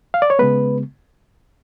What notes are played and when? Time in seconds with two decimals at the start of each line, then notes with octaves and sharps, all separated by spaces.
0.14 F5
0.22 D5
0.30 C#5
0.39 C#3 G#3 B3 B4